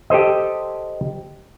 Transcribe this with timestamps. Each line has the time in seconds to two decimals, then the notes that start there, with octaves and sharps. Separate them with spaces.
0.10 G4 A4 C5 D#5